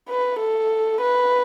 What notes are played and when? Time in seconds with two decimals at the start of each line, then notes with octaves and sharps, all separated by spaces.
0.10 B4
0.40 A4
1.02 B4